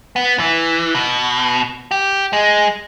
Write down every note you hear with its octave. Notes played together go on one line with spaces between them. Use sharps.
B3
E3
B2
G4
G#3